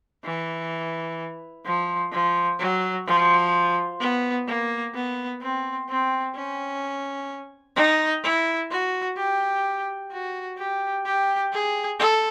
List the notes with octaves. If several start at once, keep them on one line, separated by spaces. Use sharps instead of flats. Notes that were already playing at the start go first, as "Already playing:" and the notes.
E3
F3
F3
F#3
F3
B3
A#3
B3
C4
C4
C#4
D#4
E4
F#4
G4
F#4
G4
G4
G#4
A4